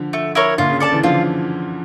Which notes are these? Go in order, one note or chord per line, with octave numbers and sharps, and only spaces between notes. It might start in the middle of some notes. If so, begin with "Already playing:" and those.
Already playing: D3 F3
A3
E4 A#4 C#5
A#2 D3 F4
C#3
A4 D5 A5
C#3 E3
D3 F3 F4